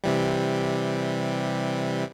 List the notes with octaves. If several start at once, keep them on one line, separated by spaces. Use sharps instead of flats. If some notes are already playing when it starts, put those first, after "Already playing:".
C3 E3 G3